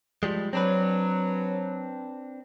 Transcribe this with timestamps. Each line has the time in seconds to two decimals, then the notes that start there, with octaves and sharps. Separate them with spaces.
0.23 F3 G3 G#3
0.53 F#3 C4 D4 B4